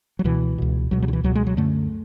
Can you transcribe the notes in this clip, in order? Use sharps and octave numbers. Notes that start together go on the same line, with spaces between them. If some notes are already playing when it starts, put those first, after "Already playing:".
F#3
C#2 B2 E3
C#2 B2
C#2 B2 F#3
F#3
D3
E3
C#2 B2 F#3
G#3
F#3
F#2 D3 A3